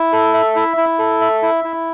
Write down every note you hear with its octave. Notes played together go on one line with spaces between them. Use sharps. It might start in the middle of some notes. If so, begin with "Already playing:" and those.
Already playing: E4
A4
E5
E4
E4
A4
E5
E4
E4